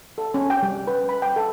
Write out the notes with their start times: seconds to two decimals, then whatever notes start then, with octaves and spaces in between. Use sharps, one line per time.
0.18 A4
0.34 C#4
0.50 G5
0.63 G3
0.87 B4
1.09 B5
1.22 G5
1.36 A4